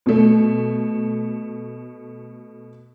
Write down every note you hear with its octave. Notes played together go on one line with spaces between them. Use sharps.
B2 A3